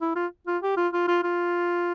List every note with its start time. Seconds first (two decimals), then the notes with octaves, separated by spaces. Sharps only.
0.01 E4
0.15 F4
0.47 F4
0.63 G4
0.77 F4
0.93 F4
1.08 F4
1.23 F4